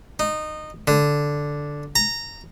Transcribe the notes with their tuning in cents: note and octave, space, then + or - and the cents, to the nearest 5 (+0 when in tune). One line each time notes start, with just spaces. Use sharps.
D#4 -20
D3 -5
A#5 -15